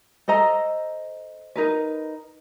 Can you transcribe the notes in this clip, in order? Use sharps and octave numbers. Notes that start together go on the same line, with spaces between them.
A4 C5 D#5 A#5
D#4 A#4 B4